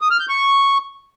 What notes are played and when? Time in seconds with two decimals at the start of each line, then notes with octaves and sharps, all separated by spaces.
0.01 D#6
0.11 F6
0.20 G6
0.29 C#6